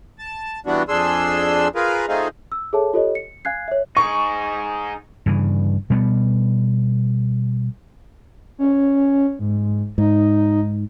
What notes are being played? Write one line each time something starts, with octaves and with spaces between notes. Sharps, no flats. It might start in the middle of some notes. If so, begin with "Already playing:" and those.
A5
E3 G3 B3 D4 F#4
F2 D4 G#4 C6 E6
F4 G#4 A#4 B4
A3 C4 D#4 F4 G#4
E6
G#4 A4 C#5 E5 A5
F4 G4 A4 C#5 D#5
C#7
F5 G#5 F#6 G#6 C7
C#5 E5
D#4 G#4 C#6
G2 C#3 E3
B2 G3 A3 B3
C#4
G#2
G#2 D#4